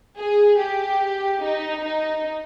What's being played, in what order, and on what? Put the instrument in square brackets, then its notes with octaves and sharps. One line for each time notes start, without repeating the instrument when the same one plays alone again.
[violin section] G#4
G4
D#4
D#4